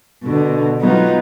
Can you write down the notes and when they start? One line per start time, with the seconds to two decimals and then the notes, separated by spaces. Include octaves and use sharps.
0.24 B2 D3
0.80 F#3 B3 D#4 F4